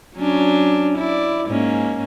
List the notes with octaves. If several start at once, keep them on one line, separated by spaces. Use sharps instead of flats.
F#3 C#4 D4
E4 D5
G#2 A#3 C#4